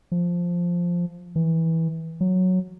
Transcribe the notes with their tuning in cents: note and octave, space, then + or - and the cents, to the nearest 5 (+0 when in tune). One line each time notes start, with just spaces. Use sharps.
F3 +0
E3 -15
F#3 -5